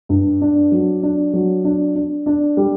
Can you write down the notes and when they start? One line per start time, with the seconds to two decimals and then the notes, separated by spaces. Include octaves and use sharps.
0.09 G2
0.41 D4
0.72 F#3
1.03 D4
1.33 F#3
1.64 D4
1.95 D4
2.26 D4
2.57 G3